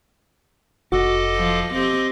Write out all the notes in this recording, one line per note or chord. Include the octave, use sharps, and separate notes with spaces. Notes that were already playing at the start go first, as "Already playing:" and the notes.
F1 F#4 A4 D#5 D6
F3
C4 G4 D#5 D6